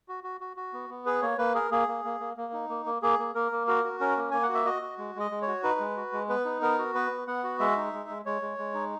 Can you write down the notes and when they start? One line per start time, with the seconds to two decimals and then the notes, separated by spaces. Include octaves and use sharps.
0.08 F#4
0.24 F#4
0.41 F#4
0.57 F#4
0.73 B3
0.90 B3
1.06 G#4 B4
1.22 A#3 C#5
1.38 A#3 B4
1.55 G#4 A#4
1.71 A#3 G#4
1.88 A#3
2.05 A#3
2.20 A#3
2.37 A#3
2.53 D#4
2.69 A#3
2.86 A#3
3.02 A#3 G#4
3.19 A#3
3.35 A#3 A#4
3.52 A#3
3.67 F#4 A#4
3.84 F#4
4.00 C#4 A#4
4.17 A#3
4.31 A#3 G#5
4.43 F#5
4.49 F#4
4.54 E5
4.65 F#4 D#5
4.82 F#4
4.98 G#3
5.15 G#3 D#5
5.31 G#3
5.42 C#5
5.47 F#4
5.63 D#4 B4
5.80 G#3
5.97 F#4
6.13 G#3
6.29 B3 B4
6.45 D#4
6.61 B3 A#4
6.78 F#4
6.95 B3 B4
7.11 B3
7.27 B3 F#5
7.44 F#4
7.60 G#3 E5
7.76 D#4
7.93 G#3
8.09 G#3
8.25 G#3 C#5
8.42 G#3
8.58 G#3
8.74 D#4